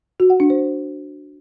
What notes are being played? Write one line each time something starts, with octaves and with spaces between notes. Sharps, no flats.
F#4
F#5
D4
C5